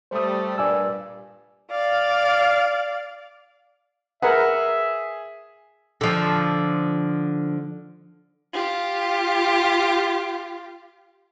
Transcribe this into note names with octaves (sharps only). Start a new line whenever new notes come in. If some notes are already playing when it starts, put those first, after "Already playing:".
G3 A3 C5 D#6
G2 A#2 D5 G#5 E6
D5 F5
G#4 A#4 B4 E5 F#5
D3 F3
F4 G4